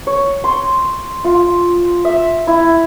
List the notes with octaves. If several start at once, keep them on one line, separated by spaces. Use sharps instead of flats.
C#5
C6
F4
E5
E4